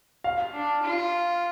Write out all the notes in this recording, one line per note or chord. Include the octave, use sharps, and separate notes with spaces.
F5
D4
F4